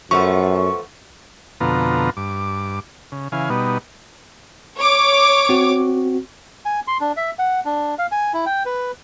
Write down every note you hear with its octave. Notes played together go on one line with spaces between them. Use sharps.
F#2 F3 A3 B3 C#6
F2 B2 D3 B3 F4 A#5
G2 D6
C#3
C#3 E3 F5 G#5
B2 G3 B3 D#4
C#5 D6
C4 F#4
G#5
C6
D4
E5
F#5
D4
F5
G#5
E4
G5
B4